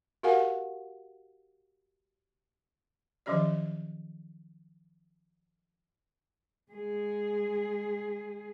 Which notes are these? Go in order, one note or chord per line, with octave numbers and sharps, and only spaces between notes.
F#4 G4 A#4 F5 F#5 G#5
D#3 F3 F#3 C#4 G4 D5
G#3 G#4